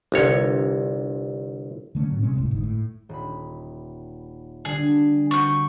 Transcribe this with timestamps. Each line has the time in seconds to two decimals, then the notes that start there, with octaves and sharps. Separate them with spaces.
0.12 G1 C2 C#5
1.95 D3 A3 B3 C#4
2.09 A2 F#3
2.23 C3 G#3 C4 C#4
2.36 F1 C2 A2
2.51 G1 G#2
2.63 A2
3.09 D#1 B5
4.65 D3 G3 D4 G#4
5.31 C4 F#4 C#6 G6